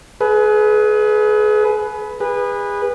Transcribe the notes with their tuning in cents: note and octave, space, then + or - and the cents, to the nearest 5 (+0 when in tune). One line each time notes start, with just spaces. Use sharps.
G#4 +35 B4 +0
G#4 -30 B4 -10